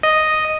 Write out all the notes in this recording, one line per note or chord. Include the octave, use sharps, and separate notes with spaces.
D#5